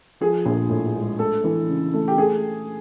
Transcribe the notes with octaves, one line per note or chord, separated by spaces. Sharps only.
F3 G#4
A#1
A2
G#3
A3 A4
E3
C#3
A3
G4
A3 G#4